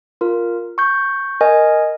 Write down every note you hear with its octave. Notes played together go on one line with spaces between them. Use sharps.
F4 A#4
C#6 G6
A#4 D#5 G#5